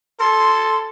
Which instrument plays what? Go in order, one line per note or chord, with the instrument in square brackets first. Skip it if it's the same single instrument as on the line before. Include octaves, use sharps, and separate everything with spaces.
[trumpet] A4 [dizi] C6